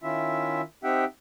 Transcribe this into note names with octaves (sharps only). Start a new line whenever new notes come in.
D#3 C#4 E4 F4 E5
C4 D#4 G4 E5 F#5 G5